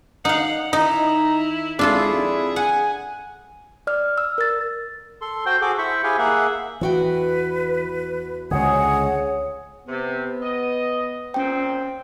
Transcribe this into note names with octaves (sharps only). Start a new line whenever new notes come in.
D#4 F5 F#5
D#3 D#4 E4 A#5
G#1 D4 E4 F4 G#4 A4
F2
F#5 G#5
D5 F6
E6
A#4 A6
A4 C6
F#4 C5 G5 C6
F#4 G#4 A4 D6
E4 C5 B5 C#6
E4 G4 G#4 F5 G5 G#5
A#3 G#4 E5 F#5
E2 E3 F#4 B4 G5
C#2 D3 G#4 C#5 F#5
C3 B3
D#5
A#2 C4 C#4 G5